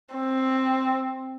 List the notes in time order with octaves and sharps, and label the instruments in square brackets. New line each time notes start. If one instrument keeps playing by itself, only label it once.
[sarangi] C4